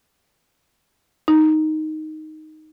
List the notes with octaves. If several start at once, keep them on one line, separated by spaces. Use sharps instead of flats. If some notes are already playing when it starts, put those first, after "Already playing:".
D#4